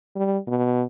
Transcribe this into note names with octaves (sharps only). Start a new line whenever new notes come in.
G3
B2